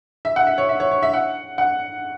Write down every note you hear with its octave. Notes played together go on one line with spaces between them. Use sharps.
E5
F#5
E5
C#5
E5
C#5
C#5
E5
F#5
F#5